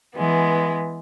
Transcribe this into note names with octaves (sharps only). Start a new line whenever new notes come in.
E3 G#3 B3